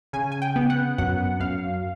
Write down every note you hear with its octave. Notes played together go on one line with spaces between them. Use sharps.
C#3 G#5
G#5
G5
B3
F#5
F#2 F#5
F#2 F5